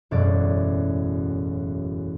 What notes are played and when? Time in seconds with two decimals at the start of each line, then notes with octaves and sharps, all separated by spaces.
0.11 E1 A1 F#2 D5